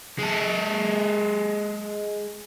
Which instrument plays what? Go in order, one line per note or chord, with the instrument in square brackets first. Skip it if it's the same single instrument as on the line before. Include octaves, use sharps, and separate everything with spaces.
[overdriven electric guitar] G#3 A4